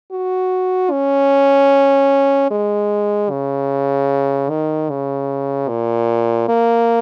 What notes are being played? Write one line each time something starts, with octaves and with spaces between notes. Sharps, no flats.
F#4
C#4
G#3
C#3
D#3
C#3
A#2
A#3